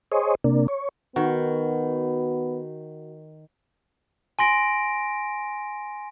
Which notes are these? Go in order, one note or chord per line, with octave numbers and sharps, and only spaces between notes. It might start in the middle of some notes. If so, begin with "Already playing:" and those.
G#4 C5 C#5 D#5
C3 A#3 D4
C#5
D#3 B3 F#4
G#5 C6 A#6 D7